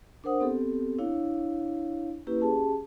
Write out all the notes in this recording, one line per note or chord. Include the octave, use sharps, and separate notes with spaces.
D4 A#4 C5 F#5 D#6
B3 C4 G4 A4
D4 E4 C#5 F5
A#3 C#4 E4 G4 B4
C#4 G4 G#4 A5